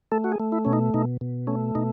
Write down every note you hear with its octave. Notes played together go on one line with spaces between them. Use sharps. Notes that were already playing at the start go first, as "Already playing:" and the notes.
A3 A4
F#4
G#4
A3
E4
B2 C#4
D#4
B2 D#4
B2
A3 C#4
B2 D#4